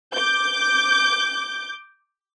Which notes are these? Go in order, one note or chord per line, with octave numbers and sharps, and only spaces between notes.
D6 G6